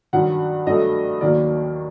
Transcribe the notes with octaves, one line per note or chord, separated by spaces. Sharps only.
G2 D#3 F#3 F#5
G2 F#3 A3 D#5
D#2 D#3 F#3 A#3 D5